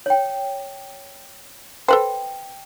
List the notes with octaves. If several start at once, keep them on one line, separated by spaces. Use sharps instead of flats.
C#5 G5
A4 B4 C5 G5